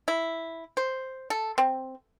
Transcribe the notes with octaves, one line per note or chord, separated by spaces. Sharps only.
E4
C5
A4
C4